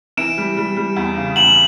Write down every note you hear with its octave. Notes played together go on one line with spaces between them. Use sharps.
E3 D7 E7
G3
G3
G3
E2
C#3
E2 E7 F#7